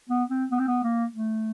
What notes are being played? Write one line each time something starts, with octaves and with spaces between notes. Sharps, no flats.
B3
C4
B3
C4
B3
A#3
A3